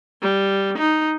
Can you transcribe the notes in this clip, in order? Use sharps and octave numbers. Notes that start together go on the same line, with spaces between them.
G3
D#4